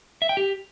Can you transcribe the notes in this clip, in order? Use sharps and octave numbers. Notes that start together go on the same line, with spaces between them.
E5
G5
G4